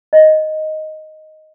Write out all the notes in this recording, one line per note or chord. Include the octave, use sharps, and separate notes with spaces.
D#5